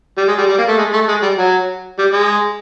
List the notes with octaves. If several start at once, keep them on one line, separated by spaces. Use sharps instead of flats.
G3
G#3
G3
G3
A#3
A3
G#3
A3
G#3
G3
F#3
G3
G#3